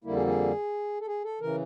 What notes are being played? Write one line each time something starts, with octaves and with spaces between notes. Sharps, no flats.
F2 D3 G3 A#3 E4
G#4
G#4
A4
G#4
A4
C#3 E3 A#4